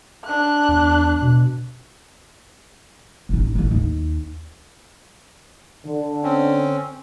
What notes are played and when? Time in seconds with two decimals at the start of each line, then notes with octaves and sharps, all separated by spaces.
0.25 D4 F#6
0.68 E2
1.22 B2
3.29 A1 D#4
3.55 A1 D3
3.71 D#2
5.86 D3
6.23 C4 C#4